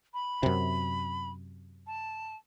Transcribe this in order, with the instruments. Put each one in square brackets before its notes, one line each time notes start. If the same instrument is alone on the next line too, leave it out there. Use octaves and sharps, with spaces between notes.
[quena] B5
[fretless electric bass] F#2 C3
[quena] A5